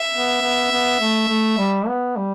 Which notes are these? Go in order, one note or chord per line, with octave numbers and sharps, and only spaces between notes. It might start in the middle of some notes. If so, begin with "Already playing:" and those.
Already playing: E5
B3
B3
B3
A3
A3
G3
B3
G3